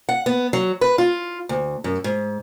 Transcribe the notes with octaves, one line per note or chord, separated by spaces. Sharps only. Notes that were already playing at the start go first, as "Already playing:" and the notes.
F#5
B3
F#3
B4
F4
D2
F#2
G#2